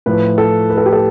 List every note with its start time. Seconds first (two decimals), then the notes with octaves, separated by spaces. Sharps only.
0.06 A2 F3 B4
0.38 A4
0.70 B4
0.78 A4
0.86 G4
0.93 A4